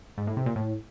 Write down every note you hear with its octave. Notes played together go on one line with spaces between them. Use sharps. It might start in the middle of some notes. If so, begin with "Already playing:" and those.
G#2
A2
C3
A#2
A2